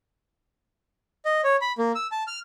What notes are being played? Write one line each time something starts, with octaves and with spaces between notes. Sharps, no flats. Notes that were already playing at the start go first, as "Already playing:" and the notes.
D#5
C#5
B5
A#3
E6
A5
F6